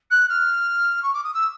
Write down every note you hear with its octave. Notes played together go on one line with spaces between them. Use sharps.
F#6
F6
C#6
D6
D#6
E6